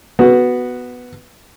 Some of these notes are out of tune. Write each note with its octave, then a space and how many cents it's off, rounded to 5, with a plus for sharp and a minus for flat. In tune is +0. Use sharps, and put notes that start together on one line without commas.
B3 +0 F#4 +0